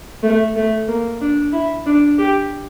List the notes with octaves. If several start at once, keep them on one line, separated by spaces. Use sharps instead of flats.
A3
A3
A#3
D4
E4
D4
G4